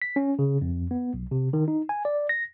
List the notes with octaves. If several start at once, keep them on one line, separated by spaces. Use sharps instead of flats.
B6
C#4
C#3
F2
B3
B1
C3
D#3
D#4
G#5
D5
A#6